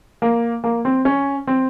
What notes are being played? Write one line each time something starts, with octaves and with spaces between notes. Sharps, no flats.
A#3
A#3
C4
C#4
C4